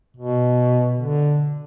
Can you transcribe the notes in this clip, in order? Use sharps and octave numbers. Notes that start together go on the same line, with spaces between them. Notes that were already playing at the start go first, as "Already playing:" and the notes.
B2
D3